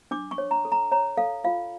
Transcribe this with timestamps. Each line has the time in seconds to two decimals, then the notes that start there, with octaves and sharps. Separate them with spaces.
0.11 D4 D6
0.31 C#6
0.38 C#5
0.51 A#5
0.65 A4
0.72 A#5
0.92 C#5 A#5
1.17 A4 F5
1.44 F4 F5